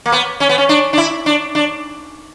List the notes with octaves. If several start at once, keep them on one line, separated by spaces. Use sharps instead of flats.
A#3
B3
C#4
B3
C#4
D4
D4
E4
D4
D4